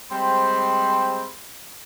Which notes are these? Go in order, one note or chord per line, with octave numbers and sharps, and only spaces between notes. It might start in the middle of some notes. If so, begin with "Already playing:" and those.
G3 G#3 C4 C5 B5 C6